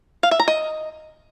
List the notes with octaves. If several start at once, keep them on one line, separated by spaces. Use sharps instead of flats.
F5
E5
A#5
D#5